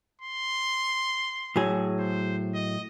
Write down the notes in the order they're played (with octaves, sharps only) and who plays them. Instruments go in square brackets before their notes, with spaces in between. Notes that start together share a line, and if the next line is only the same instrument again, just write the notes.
[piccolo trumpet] C6
[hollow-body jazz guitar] A2 F#3 G#4
[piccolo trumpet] C5
D#5